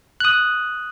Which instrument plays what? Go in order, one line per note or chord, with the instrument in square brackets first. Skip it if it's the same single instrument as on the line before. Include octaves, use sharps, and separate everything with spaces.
[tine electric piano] D#6 F#6